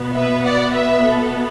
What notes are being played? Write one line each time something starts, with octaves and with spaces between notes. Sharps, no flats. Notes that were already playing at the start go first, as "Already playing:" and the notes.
Already playing: B2 B3
B4 E5
D5 F#5
B4 E5
A4